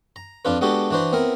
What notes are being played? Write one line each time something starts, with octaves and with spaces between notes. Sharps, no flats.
A#5
F2 D4 F4 B4
G#3 B3 D4 F#4 G4 A4
E3 D4 F#4 B4 C5
B3 C4 E4 A#4